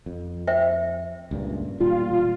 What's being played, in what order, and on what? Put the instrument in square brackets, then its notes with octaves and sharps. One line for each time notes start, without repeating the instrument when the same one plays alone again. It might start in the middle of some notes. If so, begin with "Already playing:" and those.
[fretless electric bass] F2
[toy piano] C5 E5 G5
[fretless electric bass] C#2 G2 A#2
[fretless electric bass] E1 A#2 G3 [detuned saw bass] F4